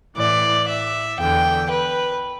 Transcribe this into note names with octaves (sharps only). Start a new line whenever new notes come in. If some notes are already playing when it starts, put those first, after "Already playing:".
A2 E3 D5
E5
E2 D3 G5
B4